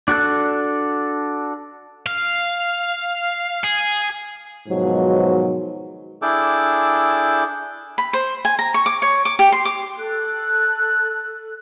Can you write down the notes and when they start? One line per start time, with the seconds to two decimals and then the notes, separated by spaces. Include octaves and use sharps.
0.08 D4 F#4 A4 F#6
2.06 F5
3.64 G#4
4.68 G#2 B2 D#3 F3 F#3
6.22 D4 E4 G#4 A4 G5 D6
7.98 B5
8.13 C5
8.45 G#5
8.59 A#5
8.74 C#6
8.86 D6
9.02 C#5
9.25 D6
9.39 G4
9.52 C6
9.65 D6
9.95 A4 F#6